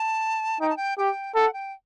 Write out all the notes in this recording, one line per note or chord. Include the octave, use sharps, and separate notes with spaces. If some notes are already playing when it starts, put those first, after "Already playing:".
Already playing: A5
D#4 G5
A5
G5
G4 G5
A4 F#5
G5